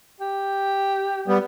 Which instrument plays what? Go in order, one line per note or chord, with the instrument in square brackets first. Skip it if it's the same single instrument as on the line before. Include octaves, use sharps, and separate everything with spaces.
[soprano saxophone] G4
[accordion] G3 B3